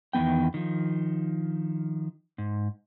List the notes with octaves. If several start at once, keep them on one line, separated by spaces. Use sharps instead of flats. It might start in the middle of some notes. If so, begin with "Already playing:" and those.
E2 D#3 G3 B3 G5
D#3 F3
G#2